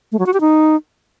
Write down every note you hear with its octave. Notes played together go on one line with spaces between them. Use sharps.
A3
F#3
F#4
G4
D#4